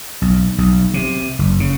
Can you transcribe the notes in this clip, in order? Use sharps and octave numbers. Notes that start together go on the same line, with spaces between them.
B1
B1
C3
F#1
C#3